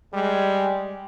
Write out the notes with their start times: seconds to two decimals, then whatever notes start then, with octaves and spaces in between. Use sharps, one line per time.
0.13 G3 G#3